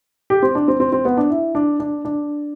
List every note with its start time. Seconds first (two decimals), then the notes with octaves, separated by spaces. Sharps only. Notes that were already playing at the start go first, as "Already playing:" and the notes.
0.30 G4
0.42 C4
0.55 D4
0.68 C4
0.80 C4
0.92 C4
1.05 B3
1.17 D4
1.30 E4
1.55 D4
1.80 D4
2.05 D4